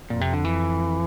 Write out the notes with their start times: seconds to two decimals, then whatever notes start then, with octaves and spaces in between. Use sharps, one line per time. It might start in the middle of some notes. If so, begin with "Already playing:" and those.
0.10 F2 A#2
0.21 C3
0.33 D3
0.45 E3